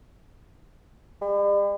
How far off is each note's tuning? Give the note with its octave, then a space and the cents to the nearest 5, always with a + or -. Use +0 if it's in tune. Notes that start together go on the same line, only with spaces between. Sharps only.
G3 +45